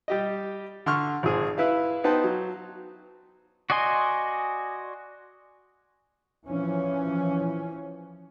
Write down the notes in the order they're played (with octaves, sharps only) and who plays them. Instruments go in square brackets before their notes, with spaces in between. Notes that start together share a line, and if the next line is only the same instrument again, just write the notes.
[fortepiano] G3 G4 D#5
D3 C6 C#6 F6
G#1 F3 G#4 C5
E4 B4 E5 F5
B3 D#4 B4 C5 G5 A5
F#3
[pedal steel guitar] F#4 D5 D#5 G#5 C6
[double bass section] E3 F3 C#4